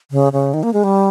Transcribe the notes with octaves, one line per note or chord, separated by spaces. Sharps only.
C#3
C#3
D#3
A#3
G#3
G3